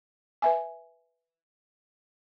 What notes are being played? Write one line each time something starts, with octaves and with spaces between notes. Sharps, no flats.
B4 E5 G#5